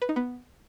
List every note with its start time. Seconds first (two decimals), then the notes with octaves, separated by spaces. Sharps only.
0.02 B4
0.09 D#4
0.16 B3